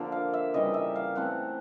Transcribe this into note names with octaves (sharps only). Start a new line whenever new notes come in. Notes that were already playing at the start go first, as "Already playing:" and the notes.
Already playing: D3 F3 A#3
F5
E5
C#3 E3 G3 D#5
E5
F5
E3 A3 C4 F#5